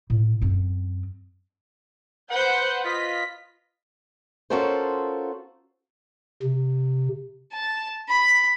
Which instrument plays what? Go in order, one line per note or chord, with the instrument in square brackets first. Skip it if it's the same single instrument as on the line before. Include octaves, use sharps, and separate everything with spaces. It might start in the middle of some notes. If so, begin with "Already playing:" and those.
[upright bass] A2
F#2 C4
[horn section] B4 F#5 [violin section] C5 G6
[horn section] F4 B4 D#5 [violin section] B6
[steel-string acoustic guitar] C#4 F4 F#4 A4 A#4 C5
[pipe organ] C3
[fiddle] A5
B5